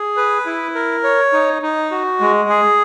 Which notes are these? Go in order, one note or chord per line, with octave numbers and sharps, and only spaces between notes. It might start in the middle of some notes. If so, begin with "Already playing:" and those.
Already playing: G#4
B4
E4
A#4
C#5
D#4
D#4
F#4
G#3
G#4